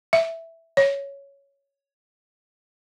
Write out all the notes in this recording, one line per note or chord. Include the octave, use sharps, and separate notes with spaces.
E5
C#5